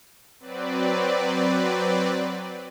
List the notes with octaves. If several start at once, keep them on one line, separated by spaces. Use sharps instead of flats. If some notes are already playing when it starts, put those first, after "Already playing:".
F#3 C4 B4 D5